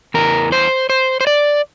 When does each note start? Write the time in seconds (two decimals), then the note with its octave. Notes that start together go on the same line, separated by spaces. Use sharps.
0.14 E2 E3 A#4
0.52 C5
0.90 C5
1.21 C5
1.27 D5